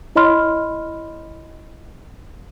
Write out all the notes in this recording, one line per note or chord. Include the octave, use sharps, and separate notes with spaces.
E4 C#5 D#5 B5 C6 F6